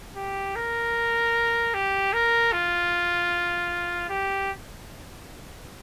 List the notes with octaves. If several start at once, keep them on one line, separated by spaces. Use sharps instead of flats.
G4
A#4
G4
A#4
F4
G4